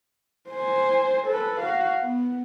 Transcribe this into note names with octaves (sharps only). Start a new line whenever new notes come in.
C5 G#5
A4 B4
F#4 F5
B3